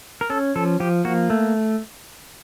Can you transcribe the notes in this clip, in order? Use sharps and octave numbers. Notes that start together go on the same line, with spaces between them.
A#4
C#4 A4
F3 A4
F3 G4
A#3 F#4
A3